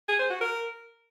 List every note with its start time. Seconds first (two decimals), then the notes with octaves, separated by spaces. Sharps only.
0.09 G#4
0.19 C5
0.30 F#4
0.41 A#4